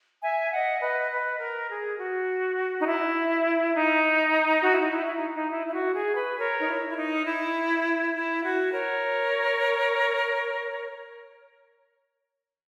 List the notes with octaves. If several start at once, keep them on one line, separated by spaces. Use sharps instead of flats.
E5 G#5
D#5 F#5
B4 D#5
B4
A#4
G#4
F#4
D#4
E4
D#4
F#4
E4
D#4
E4
E4
D#4
D#4
E4
E4
F#4
G#4
B4
A#4 C#5
D#4
E4
E4
D#4
E4
E4
F#4
A#4 C#5